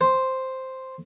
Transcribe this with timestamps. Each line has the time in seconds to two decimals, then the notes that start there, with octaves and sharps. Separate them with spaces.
0.01 C5